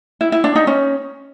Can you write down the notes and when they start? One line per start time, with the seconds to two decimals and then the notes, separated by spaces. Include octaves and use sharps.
0.21 E4
0.32 E4
0.44 D4
0.56 D#4
0.67 C#4